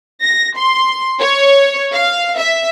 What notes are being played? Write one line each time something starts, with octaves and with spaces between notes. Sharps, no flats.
A#6
C6
C#5
F5
E5